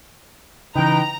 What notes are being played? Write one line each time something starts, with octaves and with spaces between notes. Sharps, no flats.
C#3 E3 D#4 B4 G5 A#5